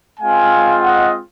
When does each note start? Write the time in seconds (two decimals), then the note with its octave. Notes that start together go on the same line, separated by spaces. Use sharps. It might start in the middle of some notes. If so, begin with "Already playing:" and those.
0.20 G#3 C4 F4 F5 G#5
0.82 D#5 F#5